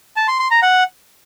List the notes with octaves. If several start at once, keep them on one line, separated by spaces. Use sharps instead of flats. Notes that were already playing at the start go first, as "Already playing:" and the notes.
A5
C6
C6
A#5
F#5